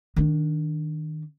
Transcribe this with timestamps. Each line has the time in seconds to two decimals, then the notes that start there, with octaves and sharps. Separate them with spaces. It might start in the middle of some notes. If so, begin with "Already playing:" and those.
0.16 D#3 D4